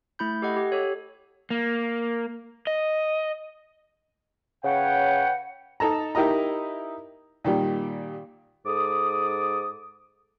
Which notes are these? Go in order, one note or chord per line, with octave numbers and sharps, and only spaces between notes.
A3 E4 B5 G6
G4 A4 D#5 F#5
G4
G4 A4 C#5
A#3
D#5
C#3 B4 C#5 F#5 G5
D#4 A4 A5 A#5
D#4 E4 G4 A#4 D#5 A#5
A#2 D#3 G3
G#2 A4 D6 D#6